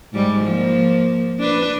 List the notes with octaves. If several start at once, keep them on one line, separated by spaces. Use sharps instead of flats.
G#2 G3
F3 A#3
D4 B4